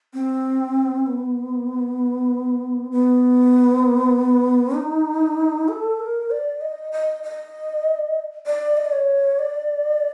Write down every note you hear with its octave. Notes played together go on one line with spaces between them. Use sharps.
C4
B3
B3
D#4
A4
A#4
D5
D#5
D#5
D#5
D5
D#5
D5
C#5
D5